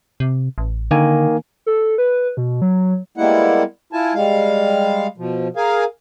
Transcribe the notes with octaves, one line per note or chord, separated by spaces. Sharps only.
C3
A1
D3 D#3 A#3 G#5
A4
B4
B2
F#3
G3 G#3 A#3 B3 E4 F#5
E4 F4 G#5 A5
G3 G#3 F5
B2 F3
G#4 A#4 F5 G#5